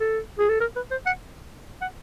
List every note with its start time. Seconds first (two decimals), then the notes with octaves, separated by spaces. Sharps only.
0.01 A4
0.39 G#4
0.50 A4
0.60 A#4
0.76 B4
0.91 C5
1.06 F#5
1.82 F#5